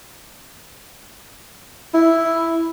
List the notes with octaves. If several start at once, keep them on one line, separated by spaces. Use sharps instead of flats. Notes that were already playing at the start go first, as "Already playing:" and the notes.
E4